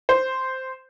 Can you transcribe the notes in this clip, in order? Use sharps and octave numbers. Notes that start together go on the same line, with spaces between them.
C5